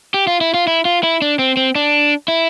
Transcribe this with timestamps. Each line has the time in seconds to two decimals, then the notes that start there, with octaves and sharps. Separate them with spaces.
0.14 G4
0.27 F4
0.41 E4
0.54 F4
0.67 E4
0.85 F4
1.03 E4
1.22 D4
1.39 C4
1.57 C4
1.75 D4
2.28 E4